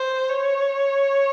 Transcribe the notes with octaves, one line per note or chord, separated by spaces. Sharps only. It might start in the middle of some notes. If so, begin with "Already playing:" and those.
Already playing: C5
C#5